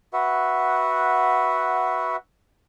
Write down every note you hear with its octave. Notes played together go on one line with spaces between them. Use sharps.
F#4 B4 E5 F#5